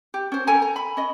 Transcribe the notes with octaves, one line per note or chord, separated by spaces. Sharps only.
G4
C#4 C5
A4 G5 G#5 A#5
A#5
B5
C#4 D#5